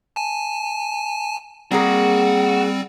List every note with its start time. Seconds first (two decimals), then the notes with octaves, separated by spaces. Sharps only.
0.16 G#5 A5
1.71 G3 A#3 C4 F#4 G#4 A#5